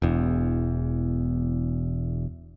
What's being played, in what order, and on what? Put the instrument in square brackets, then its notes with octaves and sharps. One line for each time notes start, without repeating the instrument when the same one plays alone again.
[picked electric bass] E1 E2